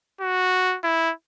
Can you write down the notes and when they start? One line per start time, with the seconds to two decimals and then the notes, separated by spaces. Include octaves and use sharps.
0.21 F#4
0.84 E4